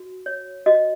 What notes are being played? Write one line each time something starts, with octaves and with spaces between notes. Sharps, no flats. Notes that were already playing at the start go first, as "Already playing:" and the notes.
Already playing: F#4
C#5
F#4 D#5